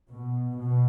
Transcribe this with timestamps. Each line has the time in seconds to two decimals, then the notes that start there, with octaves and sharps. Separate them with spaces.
0.12 B2
0.58 B2